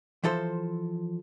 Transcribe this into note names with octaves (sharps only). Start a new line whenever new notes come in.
E3 F3 A4 C5